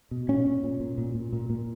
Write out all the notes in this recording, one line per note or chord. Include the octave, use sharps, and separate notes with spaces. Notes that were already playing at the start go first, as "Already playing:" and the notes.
B2
A#2 C#4
A#2
A#2
A#2
A#2
A#2
A#2
A#2